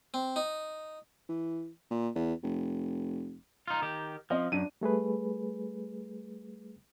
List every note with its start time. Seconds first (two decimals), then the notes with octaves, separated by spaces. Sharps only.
0.14 C4
0.36 D#4
1.29 E3
1.91 A#2
2.15 E2
2.43 F1
3.68 D#4 F4
3.82 D#3 G4
4.30 F3 C4 D#5
4.52 F#2 D4 D#7
4.81 G3 A3 G#4 B4